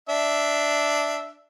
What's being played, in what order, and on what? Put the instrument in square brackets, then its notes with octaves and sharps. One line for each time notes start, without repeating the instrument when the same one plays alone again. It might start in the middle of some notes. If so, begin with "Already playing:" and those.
[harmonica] D4 E5